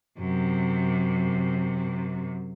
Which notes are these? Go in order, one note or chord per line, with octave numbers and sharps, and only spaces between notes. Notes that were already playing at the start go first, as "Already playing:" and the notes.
F#2 C3